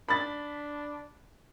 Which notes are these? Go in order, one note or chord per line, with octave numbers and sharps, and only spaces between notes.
D4 B5 A6